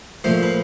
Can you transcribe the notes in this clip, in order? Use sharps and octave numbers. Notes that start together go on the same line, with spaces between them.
A#2 F3 A3 C5
B4